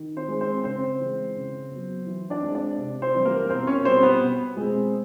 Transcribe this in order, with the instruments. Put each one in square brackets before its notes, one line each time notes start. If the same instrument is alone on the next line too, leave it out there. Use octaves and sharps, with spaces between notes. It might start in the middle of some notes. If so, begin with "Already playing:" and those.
Already playing: [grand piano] D#3
C4 C5
G#3 C4
C4 C5
C#3 C4 C5
E3 G#3
C#3
F#3 B3
E3
D4 D5
G#3 C4
D4 D5
C3
C4 C5
E3 G3
A#3 A#4
B2 C4 C5
C#4 C#5
G3 B3 C4 C5
B3 B4
B2
G#3 C4